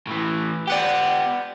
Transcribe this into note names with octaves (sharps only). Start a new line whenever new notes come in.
A2 E3
B3 G4 D5 F#5 G5